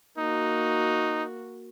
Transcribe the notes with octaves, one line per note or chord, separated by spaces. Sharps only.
A#3 D#4 F#4